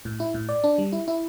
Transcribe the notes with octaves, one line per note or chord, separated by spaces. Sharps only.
A2
E4
A2
D5
D4
G3
E4
E4